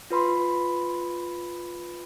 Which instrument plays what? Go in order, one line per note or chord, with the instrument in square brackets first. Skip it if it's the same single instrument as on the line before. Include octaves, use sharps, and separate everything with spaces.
[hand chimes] F4 B4 B5 C6